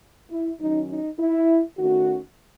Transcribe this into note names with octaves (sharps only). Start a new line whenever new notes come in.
E4
D#3 F#3 C#4 D#4
D#4
E4
D#3 A3 C#4 F#4